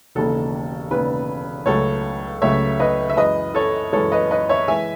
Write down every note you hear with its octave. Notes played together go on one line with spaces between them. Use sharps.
E1 D#2 C#3 A4
E1 D#2 C#3 B4
C#2 C#3 F#3 A3 A4 C#5
C#2 C#3 F#3 A3 C#5 E5
B4 D#5
E5
F#2 E3 G#3 B4 D#5
A4 C#5
F#2 E3 G#3 A4 C#5
B4 D#5
B4 D#5
C#5 E5
E3 G#3 E5 G#5